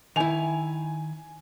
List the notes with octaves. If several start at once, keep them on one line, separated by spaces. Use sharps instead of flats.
D#3 E4 G#5 F7